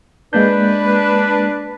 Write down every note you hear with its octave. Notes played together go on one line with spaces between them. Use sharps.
G#3 A#3 D4 B4 G6